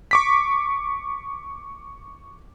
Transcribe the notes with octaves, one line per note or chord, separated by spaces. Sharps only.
C#6 D6 B6